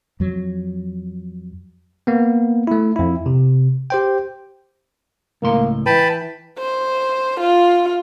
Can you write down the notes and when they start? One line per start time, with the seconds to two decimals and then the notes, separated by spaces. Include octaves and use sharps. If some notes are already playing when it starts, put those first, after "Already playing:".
0.20 F2 F#3
2.07 A#3 B3
2.67 A3 E4
2.96 F2 E4
3.26 C3
3.90 G4 C5 G5
5.42 C#2 A2 A#3 C6
5.86 E3 B4 G5 A5 B5
6.59 C5
7.40 F4